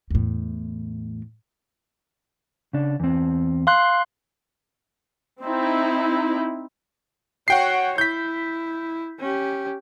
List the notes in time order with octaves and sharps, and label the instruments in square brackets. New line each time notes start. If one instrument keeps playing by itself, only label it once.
[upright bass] E2 A2
[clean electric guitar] C#3 D4
E2 C4
[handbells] F5 C6 F#6
[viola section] C4 D#4 E4
[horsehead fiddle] F#4 C#5 [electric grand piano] F#5 G5 C7
[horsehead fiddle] E4 [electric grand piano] G6 B6
[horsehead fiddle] C#4 G4